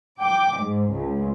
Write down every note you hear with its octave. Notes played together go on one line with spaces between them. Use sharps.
G5 D6
G#2
C#2